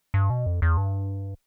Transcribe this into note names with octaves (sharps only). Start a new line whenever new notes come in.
G2
B2
F2
E2
G2